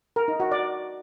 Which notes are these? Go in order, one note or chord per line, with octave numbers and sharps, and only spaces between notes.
A#4
D#4
F#4
D5